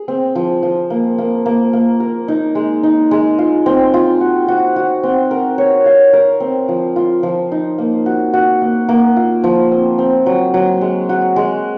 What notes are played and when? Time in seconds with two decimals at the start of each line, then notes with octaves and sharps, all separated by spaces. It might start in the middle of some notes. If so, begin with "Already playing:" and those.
Already playing: G#4
0.08 C4
0.35 F3
0.63 F3
0.90 A#3
1.18 A#3
1.46 A#3
1.73 A#3
2.00 A#4
2.28 D#4
2.55 G#3
2.83 D#4
3.11 G#3
3.38 F4
3.66 C4
3.94 F4
4.21 F#4
4.48 F#4
4.76 F#4
5.03 C4
5.31 A#4
5.58 C#5
5.86 F5
6.13 A#4
6.40 C4
6.69 F3
6.96 F4
7.23 F3
7.52 D#4
7.78 A#3
8.06 F#4
8.33 F#4
8.62 A#3
8.89 A#3
9.16 F4
9.44 F3
9.72 C4
9.98 C4
10.26 F#3
10.54 F#3
10.81 G#3
11.09 F#4
11.36 G#3